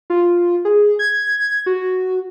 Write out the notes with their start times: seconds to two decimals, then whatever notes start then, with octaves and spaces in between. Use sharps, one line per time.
0.10 F4
0.65 G#4
0.99 G#6
1.66 F#4